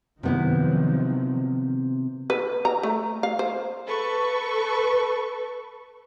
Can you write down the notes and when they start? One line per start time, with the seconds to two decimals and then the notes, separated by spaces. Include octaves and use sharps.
0.23 C3 D#3 F3 F#3 B3 E4
2.30 B4
2.65 A#5
2.83 A3
3.23 F5
3.39 C5
3.87 A4 B4 C#6